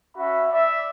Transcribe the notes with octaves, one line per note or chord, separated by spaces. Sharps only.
C#4 F#4 E5 B5
D5 E5